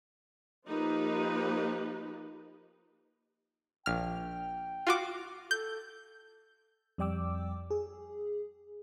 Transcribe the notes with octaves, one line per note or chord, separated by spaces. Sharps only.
F3 A#3 D#4 F4 G4 B4
A#1 G5 F6
F4 F#4 D6
A4 G6
F2 G3 D5 G5 D6 E6
G#4